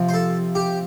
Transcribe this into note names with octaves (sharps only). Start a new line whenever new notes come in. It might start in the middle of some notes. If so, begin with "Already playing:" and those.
Already playing: C3 F3
C5
A4
G4